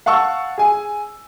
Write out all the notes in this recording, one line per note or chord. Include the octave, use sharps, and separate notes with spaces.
F5 F#5 A5 C#6 E6
G#4 G#5